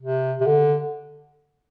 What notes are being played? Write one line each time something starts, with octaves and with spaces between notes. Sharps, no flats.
C3
C3
D3